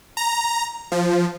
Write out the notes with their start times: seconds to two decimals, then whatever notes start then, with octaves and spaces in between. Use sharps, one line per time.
0.17 A#5
0.92 F3